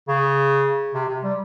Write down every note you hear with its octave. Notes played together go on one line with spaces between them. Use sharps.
C#3
C3
C3
G3